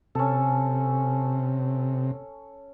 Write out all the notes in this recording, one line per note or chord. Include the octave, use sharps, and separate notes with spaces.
C3 C#4 A4